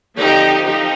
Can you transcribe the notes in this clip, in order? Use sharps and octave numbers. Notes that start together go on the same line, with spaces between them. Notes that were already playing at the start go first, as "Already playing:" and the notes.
D3 F3 C4 D#4 G4
F3 C4 D#4 G4